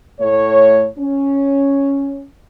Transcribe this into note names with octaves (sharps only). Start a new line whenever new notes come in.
A2 A3 C#5
C#4